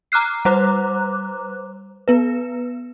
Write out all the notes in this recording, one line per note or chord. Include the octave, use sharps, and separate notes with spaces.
A#5 D6 F6 F#6 C7
G3 B4 C5 A#5 D6 F#6
B3 B4